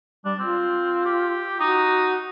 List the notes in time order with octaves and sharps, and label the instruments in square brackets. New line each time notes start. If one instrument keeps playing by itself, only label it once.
[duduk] G3 [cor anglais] D4
[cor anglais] C4 [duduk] F4
[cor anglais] G4
[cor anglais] D#4 [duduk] F#4